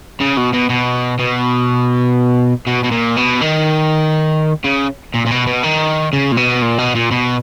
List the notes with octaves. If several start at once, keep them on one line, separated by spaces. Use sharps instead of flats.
C#3
B2
B2
B2
B2
B2
B2
A#2
B2
D#3
C#3
A#2
A#2
B2
B2
D#3
C#3
A#2
B2
A#2
B2
A#2
B2